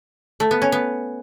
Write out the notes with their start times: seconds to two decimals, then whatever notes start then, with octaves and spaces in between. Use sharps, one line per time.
0.40 A3
0.51 B3
0.62 C#4
0.72 B3